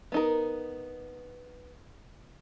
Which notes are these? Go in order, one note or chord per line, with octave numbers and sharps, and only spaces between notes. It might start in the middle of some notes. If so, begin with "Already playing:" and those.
B3 D#4 A#4